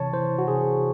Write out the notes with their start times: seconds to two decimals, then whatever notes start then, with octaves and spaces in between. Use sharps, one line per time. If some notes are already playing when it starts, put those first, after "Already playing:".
Already playing: C3 E3 C#5 A5 C#6
0.13 E3 C5
0.39 F#4
0.48 C3 G#4